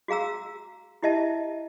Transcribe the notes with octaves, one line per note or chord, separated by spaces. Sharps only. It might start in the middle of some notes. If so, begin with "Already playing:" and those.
F#4 G#4 F5 A#5 E6
E4 G4 D#5 E5 A5